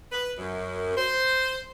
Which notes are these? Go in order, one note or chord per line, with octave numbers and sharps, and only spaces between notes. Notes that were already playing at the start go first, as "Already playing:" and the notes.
B4
F#2
C5